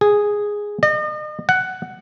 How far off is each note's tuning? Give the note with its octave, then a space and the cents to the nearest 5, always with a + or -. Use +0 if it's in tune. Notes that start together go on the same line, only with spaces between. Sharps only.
G#4 -5
D#5 -40
F#5 +10